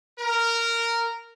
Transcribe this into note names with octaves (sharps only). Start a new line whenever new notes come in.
A#4